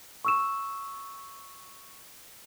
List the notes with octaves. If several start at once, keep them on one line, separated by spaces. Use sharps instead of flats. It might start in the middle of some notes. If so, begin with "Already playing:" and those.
C#6 E6 E7